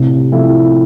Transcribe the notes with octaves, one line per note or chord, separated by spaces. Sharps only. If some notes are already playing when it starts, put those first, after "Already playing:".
Already playing: A2 C3
F3 A3 C4 E4